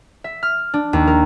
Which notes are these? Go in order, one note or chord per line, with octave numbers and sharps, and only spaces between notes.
E5
F6
D4
D#2
A#4